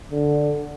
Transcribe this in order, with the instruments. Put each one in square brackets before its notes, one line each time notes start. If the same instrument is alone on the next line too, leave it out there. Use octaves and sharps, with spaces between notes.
[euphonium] D3